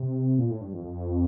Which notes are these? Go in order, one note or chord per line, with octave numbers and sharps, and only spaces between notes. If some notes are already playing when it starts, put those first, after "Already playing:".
Already playing: C3
A#2
A2
G2
F2
F2